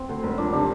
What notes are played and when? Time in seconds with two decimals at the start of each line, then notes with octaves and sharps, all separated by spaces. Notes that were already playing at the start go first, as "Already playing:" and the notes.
Already playing: C4
0.09 D2
0.23 E1
0.38 F3 D4
0.53 C3 D4